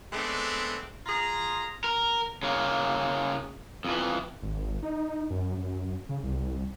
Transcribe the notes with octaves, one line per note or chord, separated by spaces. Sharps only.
G#3 A3 B3 C4 D4
F4 G#4 A#5
A#4
C#3 A#3
F2 E3
G#1
D#4
F#2
F#2
C#3
C2